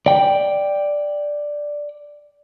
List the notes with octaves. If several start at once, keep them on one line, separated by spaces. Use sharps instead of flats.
D5 G5